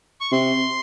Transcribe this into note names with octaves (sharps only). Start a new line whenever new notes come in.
C#6
C3 C6